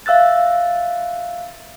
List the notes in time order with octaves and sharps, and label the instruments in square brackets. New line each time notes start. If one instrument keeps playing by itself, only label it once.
[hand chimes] E5 F5 E6 F#6 A6